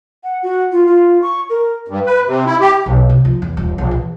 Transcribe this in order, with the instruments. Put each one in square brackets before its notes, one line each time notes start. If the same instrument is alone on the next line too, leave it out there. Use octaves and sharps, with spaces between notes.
[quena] F#5
F#4
F4
F4
C#6
A#4
[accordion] G2
B4
C3
E4
G4
[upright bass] B1
C3
F3
E2
D#1
A#1
E3